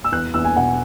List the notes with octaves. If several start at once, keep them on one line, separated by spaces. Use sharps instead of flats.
E6
E2 F#6
E2 E6
G#5
B2 F#5